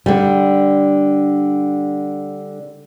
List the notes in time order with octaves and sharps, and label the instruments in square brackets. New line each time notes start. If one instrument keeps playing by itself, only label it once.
[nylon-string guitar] D3 G3